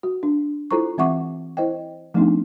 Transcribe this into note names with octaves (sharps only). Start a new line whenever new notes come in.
F#4
D4
E4 F4 A4 C5 A#5 C#6
E3 C4 E5 F#5 C#6 D6
E4 C5 D#5 G5
F3 A3 B3 C4 D4 D#4